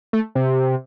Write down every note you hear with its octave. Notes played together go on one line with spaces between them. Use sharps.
A3
C3